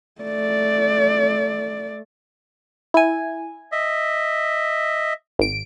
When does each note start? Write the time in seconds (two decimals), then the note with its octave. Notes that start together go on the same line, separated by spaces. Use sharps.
0.22 A3 D5
2.94 E4 G#5
3.72 D#5 E5
5.39 G#1 D7